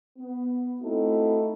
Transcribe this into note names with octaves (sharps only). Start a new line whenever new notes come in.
B3
A3 C4 D#4 E4 F#4 A4